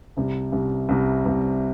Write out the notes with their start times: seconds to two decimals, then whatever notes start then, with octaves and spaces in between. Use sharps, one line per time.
0.17 C2 C3 G3
0.52 C2 C3 G3
0.89 C2 C3 G3
1.25 C2 C3 G3